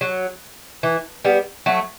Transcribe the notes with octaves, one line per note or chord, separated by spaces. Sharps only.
F#3
E3
G3 B3
F#3 A3